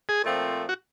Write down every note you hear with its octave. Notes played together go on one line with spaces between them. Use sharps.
G#4
A#2 F3 A3 C4
F#4